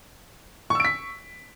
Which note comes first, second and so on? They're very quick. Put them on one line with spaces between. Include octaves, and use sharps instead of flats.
C#6 E6 D7 B6